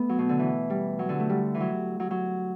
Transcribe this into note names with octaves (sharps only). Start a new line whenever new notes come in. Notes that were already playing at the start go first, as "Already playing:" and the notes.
Already playing: A3 B3
F#3
B2
D3
E3
G3
F#3
D3
A3
G3
E3
F#3
F#3
F#3